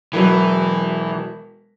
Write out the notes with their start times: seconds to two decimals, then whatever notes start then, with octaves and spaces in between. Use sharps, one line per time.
0.13 E1 E3 F#3 B4